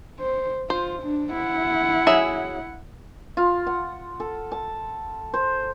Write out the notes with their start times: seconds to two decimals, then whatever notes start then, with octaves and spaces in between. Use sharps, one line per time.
0.20 C5
0.70 F4 C5
1.03 D4
1.33 E4 F#5
2.07 F#3 G#4 E5
3.37 F4
3.66 F#5
4.20 A4
4.52 A5
5.34 C5